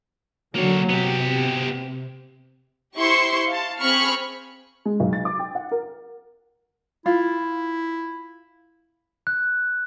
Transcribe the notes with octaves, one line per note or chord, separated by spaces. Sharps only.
D3 F#3 A#3 C#5
C3 B3 G4
E4 G4 C5 C6 C#6 C#7
F5 A5
C4 G#4 B5 C#6 F6
G#3
B1
A6
D6
G5
F#5
A#4
E4 F4
F#6